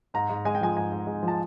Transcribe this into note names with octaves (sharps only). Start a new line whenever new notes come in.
G#2 A#5
G#2
G#3 G#5
G5
F3 G#5
G#2 G#5
G#2
G#3
F3
A5